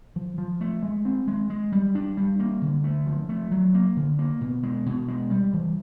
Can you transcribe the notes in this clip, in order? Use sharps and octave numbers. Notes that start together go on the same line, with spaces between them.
F3
F3
A3
G#3
C4
G#3
G#3
G3
D4
G3
A#3
D3
A3
F3
A3
F#3
A#3
D3
A#3
B2
G#3
B2
G#3
G3
E3